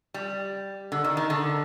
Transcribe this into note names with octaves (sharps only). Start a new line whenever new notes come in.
G3
D3
D#3
D#3
D3